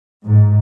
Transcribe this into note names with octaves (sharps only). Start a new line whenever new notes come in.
G#2